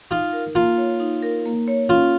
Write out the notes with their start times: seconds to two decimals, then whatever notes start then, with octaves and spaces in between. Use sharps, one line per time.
0.11 D#4 F4
0.33 A#4
0.55 A#3 F4
0.77 C#5
1.00 D#4
1.23 A#4
1.45 A#3
1.68 C#5
1.89 C#4 F4